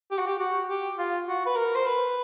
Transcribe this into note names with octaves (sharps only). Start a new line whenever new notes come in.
G4
F#4
G4
F#4
G4
F4
F#4
B4
A#4
C5
B4